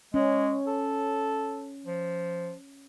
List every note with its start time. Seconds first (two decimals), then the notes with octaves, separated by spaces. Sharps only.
0.14 G#3 C#4
0.67 A4
1.86 F3